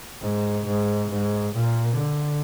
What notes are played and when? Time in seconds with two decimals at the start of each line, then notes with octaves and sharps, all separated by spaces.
0.22 G#2
0.66 G#2
1.10 G#2
1.54 A#2
1.98 D3